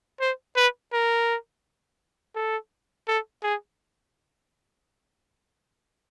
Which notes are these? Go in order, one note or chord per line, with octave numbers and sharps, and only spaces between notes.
C5
B4
A#4
A4
A4
G#4